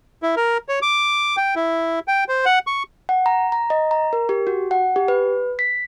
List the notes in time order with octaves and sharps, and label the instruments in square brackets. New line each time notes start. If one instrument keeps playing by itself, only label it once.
[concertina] E4
A#4
C#5
D6
G5
E4
G5
C5
F#5
C#6
[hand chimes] F#5
A#5
A#5
D#5
A#5
A#4
G4
F#4
F#5
G4
B4
B6